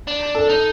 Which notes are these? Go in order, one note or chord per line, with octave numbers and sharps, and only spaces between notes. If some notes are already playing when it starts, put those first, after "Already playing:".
D4
A4
D#4